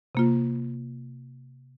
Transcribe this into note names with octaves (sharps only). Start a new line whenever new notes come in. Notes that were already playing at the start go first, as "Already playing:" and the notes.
C3 A#3 F4